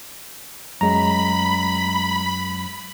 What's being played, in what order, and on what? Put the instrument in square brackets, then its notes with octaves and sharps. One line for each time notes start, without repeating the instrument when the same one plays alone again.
[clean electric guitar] F#2 [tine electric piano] G#3 A#5 [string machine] B5